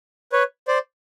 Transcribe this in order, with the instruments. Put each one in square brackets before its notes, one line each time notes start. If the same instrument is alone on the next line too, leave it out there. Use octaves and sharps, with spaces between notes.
[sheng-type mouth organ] B4 C#5
C5 D5